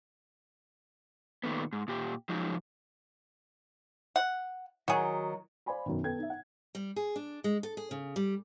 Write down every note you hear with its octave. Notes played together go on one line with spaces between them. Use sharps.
A#2 D#3 G3 A3 B3
G#2
A#2 G4
F3 F#3 G#3 D#4
F#5
D#3 F#3 F#4 G#4
C5 D5 F5 G#5 B5 C6
F#2 B2 D#3
B3 A4 G5 G#6
D#4 E5
F#5
G3
G#4
D4
G#3
A4
G#4
C#3
G3